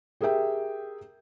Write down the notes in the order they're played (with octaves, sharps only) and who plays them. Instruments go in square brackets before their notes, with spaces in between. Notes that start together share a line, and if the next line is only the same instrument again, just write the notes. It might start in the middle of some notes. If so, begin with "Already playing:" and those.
[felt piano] G4 G#4 A#4 E5 G5